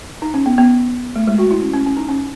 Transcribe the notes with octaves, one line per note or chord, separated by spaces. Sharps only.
D#4
C#4
B3
B3
A3
G#3
F#4
E4
C#4
C#4
C#4
D#4
C#4